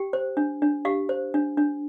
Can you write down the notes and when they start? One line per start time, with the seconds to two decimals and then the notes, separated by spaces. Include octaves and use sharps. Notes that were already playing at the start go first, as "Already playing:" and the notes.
Already playing: G4 G5
0.13 C5
0.37 D4
0.62 D4
0.85 G4 F5
1.09 C5
1.34 D4
1.57 D4